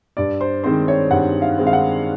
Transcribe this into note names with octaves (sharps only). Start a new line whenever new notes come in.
G2 D5
C5
D#3 G#3 C4 C5
C#5
G2 F#5
F5
D#3 G#3 C4
F5
F#5